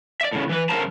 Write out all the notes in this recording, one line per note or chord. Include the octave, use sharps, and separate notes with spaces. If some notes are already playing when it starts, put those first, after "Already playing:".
D5 E5
A2 C#3
E3 B4
F#2 C#3 A#4 C5 A5 A#5